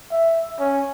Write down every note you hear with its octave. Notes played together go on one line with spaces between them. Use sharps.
E5
C#4